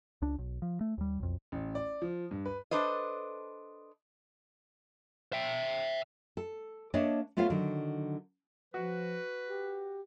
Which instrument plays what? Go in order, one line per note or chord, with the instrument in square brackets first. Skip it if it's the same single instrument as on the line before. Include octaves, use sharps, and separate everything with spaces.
[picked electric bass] C#2 D4
B1
F3
A3
D#2 G3
B1 F2
[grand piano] A1
D5
F3
G2
B4
[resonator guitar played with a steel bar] D4 A4 B4 C5 D#5
[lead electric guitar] E5 G5
[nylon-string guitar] A4
A#3 D4 C#5 D#5 E5 A5
A3 B3 F4 A4 C#5 F5
D3 D#3 F#3
[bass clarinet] F3 [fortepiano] F#4 [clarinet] B4
[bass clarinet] G4